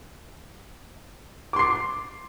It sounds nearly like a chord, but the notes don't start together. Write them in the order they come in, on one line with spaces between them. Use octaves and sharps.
D6 C6 C7